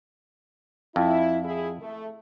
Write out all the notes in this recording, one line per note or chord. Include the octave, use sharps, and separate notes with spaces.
F2 E4
E4 G#4
A3